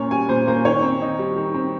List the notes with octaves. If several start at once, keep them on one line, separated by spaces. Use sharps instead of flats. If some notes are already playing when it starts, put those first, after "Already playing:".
Already playing: A#2 A#3 C#4 C#5
G3 G#5
A#2 C5
A#3 C5
D#3 C#5
C4
D#4
G3
D#3
C4